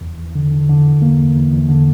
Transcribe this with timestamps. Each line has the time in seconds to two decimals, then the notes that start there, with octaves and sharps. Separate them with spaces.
0.01 E2
0.18 E2
0.35 D3
0.52 D3
0.69 D3
0.85 E2
1.02 A#3
1.19 E2
1.36 E2
1.52 E2
1.69 D3